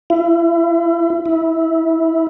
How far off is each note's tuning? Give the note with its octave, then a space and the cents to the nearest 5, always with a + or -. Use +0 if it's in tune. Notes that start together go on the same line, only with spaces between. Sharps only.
E4 +35
E4 -15